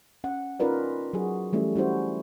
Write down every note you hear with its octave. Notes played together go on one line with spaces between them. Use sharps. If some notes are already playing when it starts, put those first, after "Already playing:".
C#4 F#5
C#4 D#4 F4 A#4 B4 D5
F#3 F#4 G#4
E3 G3 A3 C#4 E4
G3 C#4 E4 F#4 C5